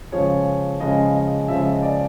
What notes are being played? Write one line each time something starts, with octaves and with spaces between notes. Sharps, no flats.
C#3 F3 G#3 C#5
C#3 F3 G#3 D#5
D#5
C#3 F3 G#3 E5
D#5
D5